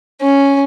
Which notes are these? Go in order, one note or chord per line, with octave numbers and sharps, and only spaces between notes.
C#4